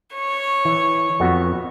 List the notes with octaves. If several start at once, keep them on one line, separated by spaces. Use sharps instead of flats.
C#5
E3
F2 B3 F#4